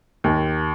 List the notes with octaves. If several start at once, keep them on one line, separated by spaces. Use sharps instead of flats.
D#2